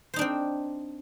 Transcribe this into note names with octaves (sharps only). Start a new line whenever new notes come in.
C4 D4 D#4 C5